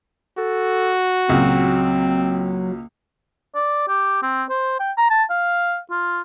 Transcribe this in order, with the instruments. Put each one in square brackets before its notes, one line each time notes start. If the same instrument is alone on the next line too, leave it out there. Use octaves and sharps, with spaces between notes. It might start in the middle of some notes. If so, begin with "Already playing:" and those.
[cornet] F#4 [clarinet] A4
[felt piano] C#2 A#2 [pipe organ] F#3 [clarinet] C4
[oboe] D5
G4
C4
C5
G5
A#5
A5
F5
F4